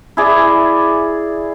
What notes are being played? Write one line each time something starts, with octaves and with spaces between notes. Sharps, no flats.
E4 G#4 D5